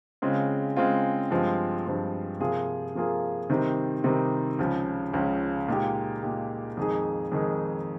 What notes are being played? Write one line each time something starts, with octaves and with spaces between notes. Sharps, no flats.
C#3 G#3 C4 F4
C#3 G#3 C4 F4
G2 F3 G#3 C4
G2 F3 G#3 C4
C3 F3 A#3 F4 G#4
C3 F3 A#3 F4 G#4
C3 D#3 G3 C4 D#4
C3 D#3 G3 C4 D#4
C#2 C#3 F3
C#2 C#3 F3
A#2 G#3 D#4 G4
A#2 G#3 D#4 G4
F2 D#3 G#3 D#4 G#4
F2 D#3 G#3 D#4 G#4